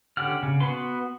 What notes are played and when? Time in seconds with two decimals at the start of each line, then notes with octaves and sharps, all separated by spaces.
0.17 D3 C#4 G4 F#5 F6
0.43 C#3
0.61 B3 F#4 B4 C6